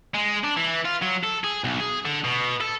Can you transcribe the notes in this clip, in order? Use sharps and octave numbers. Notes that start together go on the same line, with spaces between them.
G#3
D4
E3
F4
F#3
A4
G#4
B1
G#4
D3
B2
A4